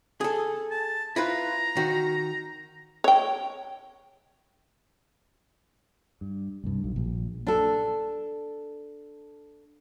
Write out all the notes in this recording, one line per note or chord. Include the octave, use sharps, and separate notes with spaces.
G#4 A4
A5
E4 F4 B4 A#5
D#3 F#4
C#5 G5
G2
C2 G2
B1
A#1
D4 A4